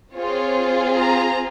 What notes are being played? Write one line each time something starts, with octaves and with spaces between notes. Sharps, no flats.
C4 F4 G#4 C#5
A#5